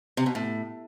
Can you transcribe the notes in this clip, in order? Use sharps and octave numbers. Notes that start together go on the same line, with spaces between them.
C3
B2
A2